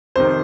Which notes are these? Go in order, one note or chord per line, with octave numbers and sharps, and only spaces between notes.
F2 C3 D#3 C5